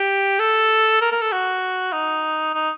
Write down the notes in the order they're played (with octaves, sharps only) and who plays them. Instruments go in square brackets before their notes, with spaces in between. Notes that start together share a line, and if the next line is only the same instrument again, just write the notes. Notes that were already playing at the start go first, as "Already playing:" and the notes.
Already playing: [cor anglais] G4
A4
A#4
A#4
A4
F#4
D#4
D#4